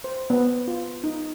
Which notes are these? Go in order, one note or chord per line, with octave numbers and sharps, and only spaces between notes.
C5
B3
F4
D#4